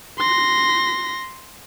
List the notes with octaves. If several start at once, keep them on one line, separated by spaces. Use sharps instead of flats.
C6 A#6